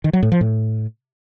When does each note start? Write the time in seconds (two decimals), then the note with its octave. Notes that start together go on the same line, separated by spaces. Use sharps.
0.04 D#3
0.13 F#3
0.23 A2
0.32 F3
0.41 A2